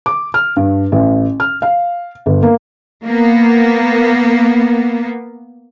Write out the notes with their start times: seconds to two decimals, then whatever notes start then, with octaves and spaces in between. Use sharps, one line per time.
0.06 D6
0.34 F6
0.57 G2
0.92 A1
1.40 F6
1.62 F5
2.26 G1
2.43 A#3
3.05 A#3 B3